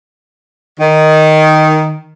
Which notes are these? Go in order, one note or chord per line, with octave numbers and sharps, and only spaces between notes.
D#3